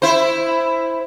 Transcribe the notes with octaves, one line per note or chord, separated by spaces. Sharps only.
E4 C5